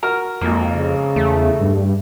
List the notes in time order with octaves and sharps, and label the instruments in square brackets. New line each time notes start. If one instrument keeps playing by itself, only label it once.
[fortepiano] F#4 A#4 F6
[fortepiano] G#1 A#3 [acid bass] F2
[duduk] C#3
[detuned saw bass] E2 [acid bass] A3
[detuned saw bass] G2